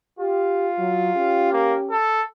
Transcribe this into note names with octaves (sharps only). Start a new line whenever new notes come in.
F4 G4
F#3
C#4 G4
A#3
A4